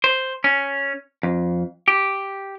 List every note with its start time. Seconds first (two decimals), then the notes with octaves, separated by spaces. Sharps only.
0.04 C5
0.44 C#4
1.23 F2
1.88 G4